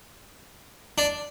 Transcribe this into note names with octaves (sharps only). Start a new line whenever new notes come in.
D4